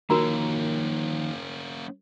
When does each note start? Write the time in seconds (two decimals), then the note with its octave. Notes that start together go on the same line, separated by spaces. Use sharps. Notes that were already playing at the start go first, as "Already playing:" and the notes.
0.10 D#3 F3 A#3 C#4 F#4 A#4 A#5